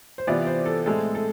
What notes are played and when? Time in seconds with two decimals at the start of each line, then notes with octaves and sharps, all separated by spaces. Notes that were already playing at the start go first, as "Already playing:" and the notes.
0.18 C5
0.27 C3 E3 B3 F4 D5
0.47 C5
0.66 A4
0.86 A2 G#3 C4 A4
1.15 A4